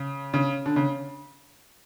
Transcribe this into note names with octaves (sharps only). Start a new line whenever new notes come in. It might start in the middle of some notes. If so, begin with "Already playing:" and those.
Already playing: C#3
C#3
D3
C#3